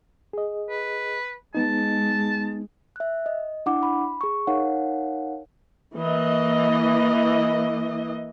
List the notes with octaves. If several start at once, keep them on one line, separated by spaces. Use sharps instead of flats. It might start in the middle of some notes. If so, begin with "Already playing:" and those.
G#4 D#5
B4
G#3 B3 D#4 A5
E5 F#6
D#5
D4 E4 F#5 D6
B5
G#4 C#6
D#4 A#4 C#5 F5 F#5
E3 A#3 D#5